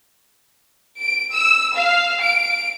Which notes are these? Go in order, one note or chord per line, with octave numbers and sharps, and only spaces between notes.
D7
E6
F5
D7